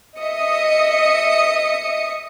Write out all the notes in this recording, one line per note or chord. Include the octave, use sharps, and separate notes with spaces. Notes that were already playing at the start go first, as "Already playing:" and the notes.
D#5 E5 D#6 C#7